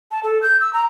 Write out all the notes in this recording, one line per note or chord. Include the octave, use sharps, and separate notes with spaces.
A5
A4
G6
E6
A#5